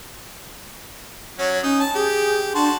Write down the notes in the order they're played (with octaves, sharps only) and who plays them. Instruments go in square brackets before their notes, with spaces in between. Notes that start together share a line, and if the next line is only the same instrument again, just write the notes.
[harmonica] F#3 C#4 F#4 [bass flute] C#5
[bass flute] C#4 [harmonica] D#4
[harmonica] A5
[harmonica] G4 [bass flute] G#4
[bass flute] D4 [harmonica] F#4 A5 C6